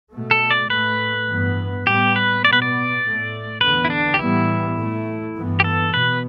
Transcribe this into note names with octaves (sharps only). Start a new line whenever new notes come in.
B2 A3
A4
D5
A2 A3 B4
G2 E3 B3
A2 G3 B3 G4
B4
B2 B3 D5
B4
D5
A2 A3
E2 D3 B3 B4
E4
D4
G4
A2 E3 G3 B3 E4
A2 A3
G2 E3 B3
G4
A4
B2 B3 B4